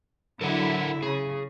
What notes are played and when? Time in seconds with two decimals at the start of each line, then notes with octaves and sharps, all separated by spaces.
0.41 D3 F#3 E4 A4 A#4 F#5
1.02 C#3 G#4